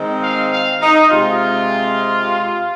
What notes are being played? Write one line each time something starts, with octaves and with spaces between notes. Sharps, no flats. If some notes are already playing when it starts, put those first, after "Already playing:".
Already playing: D#3 G#3 C4
F5
F5
D#4
C3 G#3 C4 F4